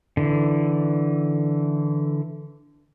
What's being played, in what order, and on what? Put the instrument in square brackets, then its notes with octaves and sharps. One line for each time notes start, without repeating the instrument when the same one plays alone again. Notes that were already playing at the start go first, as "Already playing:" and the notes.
[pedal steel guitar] D3 E3